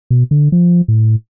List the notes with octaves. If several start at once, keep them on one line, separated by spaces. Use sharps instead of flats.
B2
D3
F3
A2